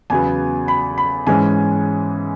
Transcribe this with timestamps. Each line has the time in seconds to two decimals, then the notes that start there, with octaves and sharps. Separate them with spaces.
0.10 E2 C#3 F#3 B3 G#5
0.68 B5
0.98 B5
1.27 G#2 E3 G#3 C#4 G#5